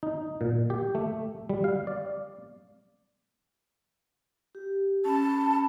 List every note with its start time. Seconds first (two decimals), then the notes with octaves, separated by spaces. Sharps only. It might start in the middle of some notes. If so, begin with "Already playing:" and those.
0.03 D#4
0.41 A#2
0.70 G4
0.95 A3
1.49 G3
1.64 F5
1.87 D5
4.55 G4
5.05 C#4 A5 B5